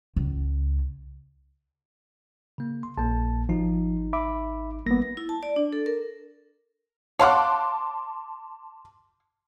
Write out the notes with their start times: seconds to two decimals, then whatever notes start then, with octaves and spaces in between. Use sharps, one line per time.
0.16 C#2
2.58 C#3 A#3
2.83 C6
2.97 A#1 A#2 A#3 A5
3.49 G#1 F3 D#4
4.13 E5 B5 D6
4.86 G#1 G3 A#3 B3 A#6
5.17 E4
5.29 A5
5.43 D5
5.56 D4
5.73 A4
5.86 A#4
7.19 C#5 F5 F#5 A5 C6 D6